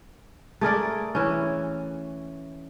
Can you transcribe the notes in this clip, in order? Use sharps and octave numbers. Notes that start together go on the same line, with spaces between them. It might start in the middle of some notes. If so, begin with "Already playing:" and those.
A3 G#4 A#4 D5
E3 C#4